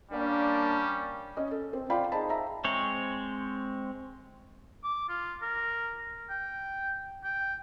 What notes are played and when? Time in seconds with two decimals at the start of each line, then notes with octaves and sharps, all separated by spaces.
0.12 G3 A#3 C#4 D4
1.37 C#4 D#5
1.51 A4
1.73 C4
1.90 F4 D5 F5 G5 B5
2.12 D#4 G#4 C5 A5 B5
2.29 E5 A#5
2.65 G#3 C4 C#5
4.84 D6
5.09 F4
5.41 A#4
6.30 G5
7.24 G5